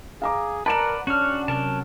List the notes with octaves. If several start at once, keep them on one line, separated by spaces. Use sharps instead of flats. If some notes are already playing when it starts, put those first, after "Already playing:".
G#4 F5 A#5 D6
A#4 B4 D5 F#5 A5 A#5 E7
C#4 D4 F#4 F6
C3 F#3 A#4 A5